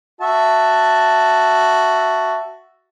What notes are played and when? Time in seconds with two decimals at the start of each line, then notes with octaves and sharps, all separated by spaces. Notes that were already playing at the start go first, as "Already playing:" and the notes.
0.21 F#4 E5 A5